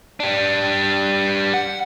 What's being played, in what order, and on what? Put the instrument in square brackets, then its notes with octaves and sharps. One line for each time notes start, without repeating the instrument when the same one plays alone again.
[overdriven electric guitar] G3 D4
F#5